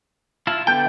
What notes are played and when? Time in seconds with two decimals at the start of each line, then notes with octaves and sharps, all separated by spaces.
0.47 E4 F4 A5
0.67 D3 B3 A4 G5